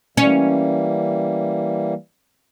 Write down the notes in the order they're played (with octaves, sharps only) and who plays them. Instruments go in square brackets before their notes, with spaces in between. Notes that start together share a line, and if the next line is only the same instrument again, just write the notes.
[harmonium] E3 G3 A#3 [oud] C#4